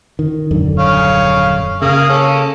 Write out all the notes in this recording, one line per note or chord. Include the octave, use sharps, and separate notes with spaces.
D#3
D#1 F#2 D3
C#5 F5
C#3 A#3 G#4 F5
A#3 C#4 A4